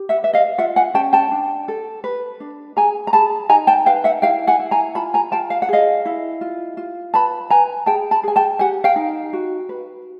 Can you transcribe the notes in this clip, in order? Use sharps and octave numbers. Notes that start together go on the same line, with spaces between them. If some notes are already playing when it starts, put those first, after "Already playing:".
Already playing: G4
E5 F#5
B4 E5
D#5 F5
F4 E5 F#5
F#5 G#5
C#4 G5 A5
G5 A5
D4
A4
B4
D4
G#4 G#5 A#5
A#5
G#4 A5 B5
D#4 G#5 A#5
G5 A5
B4 F5 G5
E5 F#5
E4 F5 G5
F#5 G#5
E4
G#5 A#5
F4 A5 B5
G#5 A#5
F4 G5 A5
F5
F#5
G#4 D#5 F5
E4
F4
F4
B4 A5 B5
B4 G#5 A#5
G#4 G5 A5
A5 B5
G#4 G#5
G5 A5
G4 F#5 G#5
F5 G5
D#4
F#4
B4